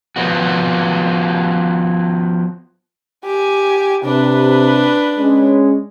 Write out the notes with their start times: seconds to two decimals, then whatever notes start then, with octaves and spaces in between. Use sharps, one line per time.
0.16 F3 B3 F#4
3.24 G4 G#5
4.04 C3 D4 B4
5.18 G#3 C#4